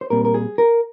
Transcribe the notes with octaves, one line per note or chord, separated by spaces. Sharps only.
C5
A#2 G3 C4 A#4
A#4
G#4
A#4